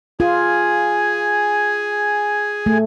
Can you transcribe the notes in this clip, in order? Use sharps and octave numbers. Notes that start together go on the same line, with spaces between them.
F4 G#4 G#5
A3